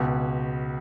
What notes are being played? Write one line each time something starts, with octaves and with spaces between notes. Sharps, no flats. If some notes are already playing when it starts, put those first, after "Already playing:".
Already playing: C#2 B2